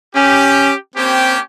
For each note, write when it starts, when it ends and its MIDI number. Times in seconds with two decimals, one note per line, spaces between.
0.16 0.72 61
0.16 0.76 67
0.96 1.39 58
0.96 1.34 60
0.96 1.39 61
0.96 1.39 67